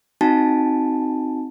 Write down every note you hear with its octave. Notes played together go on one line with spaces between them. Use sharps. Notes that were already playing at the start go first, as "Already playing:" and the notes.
C4 D#4 F#4 G#5 A5